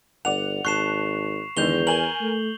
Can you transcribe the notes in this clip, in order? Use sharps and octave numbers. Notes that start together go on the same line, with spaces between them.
G1 D5 F#5 F7
G#1 A5 C#6 F#6 C7 E7
E2 D3 D#3 G#3 G6 F7 G7
A#4 G#5 F#7 G7
A3